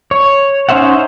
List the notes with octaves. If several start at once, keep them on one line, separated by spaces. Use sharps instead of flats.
C#5
C#4 D#4 C5 E5 F#5